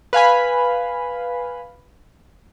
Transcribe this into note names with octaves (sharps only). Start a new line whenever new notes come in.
B4 F5 G#5 B5